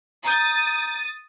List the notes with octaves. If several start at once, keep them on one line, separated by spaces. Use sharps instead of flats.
A#5 D#6 G6 A6